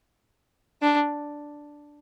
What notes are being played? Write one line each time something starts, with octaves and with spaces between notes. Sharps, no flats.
D4